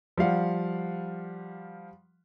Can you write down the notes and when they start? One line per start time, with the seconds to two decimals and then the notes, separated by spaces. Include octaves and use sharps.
0.18 F3 G3 F5 F#5